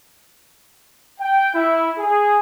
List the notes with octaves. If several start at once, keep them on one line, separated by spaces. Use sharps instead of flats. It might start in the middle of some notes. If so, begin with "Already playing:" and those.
G5
E4
G#4